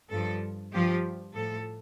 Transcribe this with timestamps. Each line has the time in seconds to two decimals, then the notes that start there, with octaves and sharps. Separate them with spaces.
0.10 G2 F3 A4
0.72 G2 F3 G4
1.34 A2 F3 A4